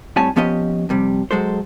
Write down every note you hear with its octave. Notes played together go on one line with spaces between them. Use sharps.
A2 G3 C4 C#5 G#5 A5
F2 F3 B3 C#4 G4 D#5
F2 C3 G3
F#3 G#3 A4 C5